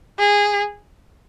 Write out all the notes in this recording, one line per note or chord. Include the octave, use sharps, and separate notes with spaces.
G#4